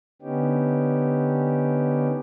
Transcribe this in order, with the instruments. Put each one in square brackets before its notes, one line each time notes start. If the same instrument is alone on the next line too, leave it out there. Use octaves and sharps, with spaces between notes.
[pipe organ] D3 B3 C#4 D#4 G4